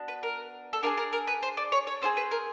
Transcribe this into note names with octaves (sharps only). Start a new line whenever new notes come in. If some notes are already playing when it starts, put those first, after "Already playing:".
Already playing: B3 D4 F#4
B4
A#4
A4
D4 F4 G#4 A#4
A#4
A#4
B4
C5
D5
C#5
C#5
C4 F4 G#4 C5
B4
A#4